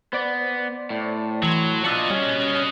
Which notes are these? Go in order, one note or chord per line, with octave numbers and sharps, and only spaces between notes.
B3 C5 D5
A2
E3 F#3 C6 G#6
F3 F#4 D5 D#5 E6 F#6 C#7
G3 C#4